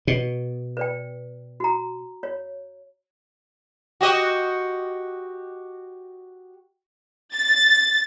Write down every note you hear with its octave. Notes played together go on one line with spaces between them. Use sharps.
B2
B4 D5 G5
F#4 A#5
C#5
F#4 G4 D#5
A6